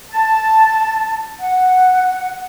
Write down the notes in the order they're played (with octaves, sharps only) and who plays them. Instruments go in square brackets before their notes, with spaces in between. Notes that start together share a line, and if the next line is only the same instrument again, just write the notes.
[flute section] A5
F#5